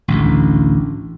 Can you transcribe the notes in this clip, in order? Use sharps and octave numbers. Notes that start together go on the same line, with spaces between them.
A1 D2